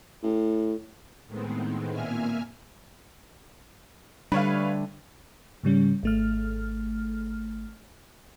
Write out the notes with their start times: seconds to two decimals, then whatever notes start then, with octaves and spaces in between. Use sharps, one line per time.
0.23 A2
1.27 A2 D#3 G#3 B3 C4
1.92 A#2 A#3 E5 G#5 F6
4.32 D3 G3 A3 D4 B4 C#5 F5
5.63 G#2 C#3 G3 C#4
6.03 G#1 A3 F6